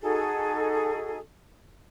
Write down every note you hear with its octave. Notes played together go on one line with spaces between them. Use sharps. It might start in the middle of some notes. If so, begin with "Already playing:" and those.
D#4 F#4 G#4 A4